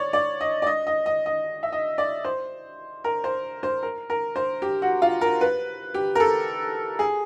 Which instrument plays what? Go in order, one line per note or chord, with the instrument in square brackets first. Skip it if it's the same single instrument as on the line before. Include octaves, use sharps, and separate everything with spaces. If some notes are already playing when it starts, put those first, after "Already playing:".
Already playing: [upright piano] C#5 D5
D5
D#5
D5
D#5
D#5
D#5
D#5
E5
D#5
D5
C5
A#4
C5
C5
A#4
A#4
C5
G4
F#4
F4
A#4
B4
G4
A#4
A4
G#4